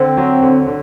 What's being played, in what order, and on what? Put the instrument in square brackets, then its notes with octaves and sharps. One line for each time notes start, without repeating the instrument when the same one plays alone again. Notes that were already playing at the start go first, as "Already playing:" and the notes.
Already playing: [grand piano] D3 [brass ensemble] C4
[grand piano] F#3
D3
D3